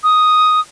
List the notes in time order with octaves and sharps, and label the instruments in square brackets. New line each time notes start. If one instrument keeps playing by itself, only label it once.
[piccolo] D#6